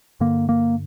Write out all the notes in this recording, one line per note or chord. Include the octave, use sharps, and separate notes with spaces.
G2 D3 A#3
A#3